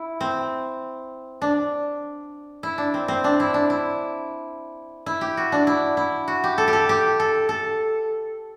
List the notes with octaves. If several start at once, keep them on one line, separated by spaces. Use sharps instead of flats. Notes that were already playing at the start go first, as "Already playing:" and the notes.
Already playing: E4
C4
D4
E4
D4
C4
C4
D4
E4
D4
E4
E4
G4
F#4
D4
E4
E4
F#4
G4
A4
G4
A4
G4
A4
A4